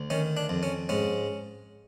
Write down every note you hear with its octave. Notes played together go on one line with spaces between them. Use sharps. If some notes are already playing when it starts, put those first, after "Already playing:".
Already playing: D2
D#3 C#4
D4
F2
C#4
G#2 C#4